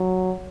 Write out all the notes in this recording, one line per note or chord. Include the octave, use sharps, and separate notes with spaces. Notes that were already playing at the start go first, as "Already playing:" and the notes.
Already playing: F#3